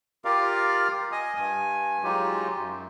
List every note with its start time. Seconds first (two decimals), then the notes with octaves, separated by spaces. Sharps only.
0.25 F4 G4 A#4 D5 F5
1.12 D#5 G#5 D#6
1.37 G2 G#5
2.04 F#3 G#3 D#4 F4 G4
2.57 F#2